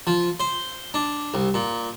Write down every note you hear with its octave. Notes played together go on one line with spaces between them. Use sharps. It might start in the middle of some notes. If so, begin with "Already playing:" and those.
F3
C5
D4
C2
A#2